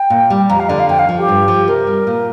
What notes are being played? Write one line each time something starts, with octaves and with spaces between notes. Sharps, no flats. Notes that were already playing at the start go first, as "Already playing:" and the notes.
Already playing: G5
A#2
G3
F2 A#5
F5
D3 D5
F5
F2 G5
F5
F3
G4
G2
F3
C3 A#4
G3
A#2